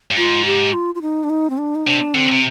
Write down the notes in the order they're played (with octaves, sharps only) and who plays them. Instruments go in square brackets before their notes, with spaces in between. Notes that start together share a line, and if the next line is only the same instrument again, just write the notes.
[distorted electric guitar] G2
[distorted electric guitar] G#2 [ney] F4
[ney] G4
F4
F4
D#4
D4
D#4
C4
D4
D#4
[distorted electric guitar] C3 [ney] D4
[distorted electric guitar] D3 [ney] C4
[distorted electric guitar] C3